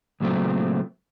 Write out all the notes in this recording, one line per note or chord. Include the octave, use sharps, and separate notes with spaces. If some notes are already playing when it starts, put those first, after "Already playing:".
C#2 A#2 F#3 A3 C4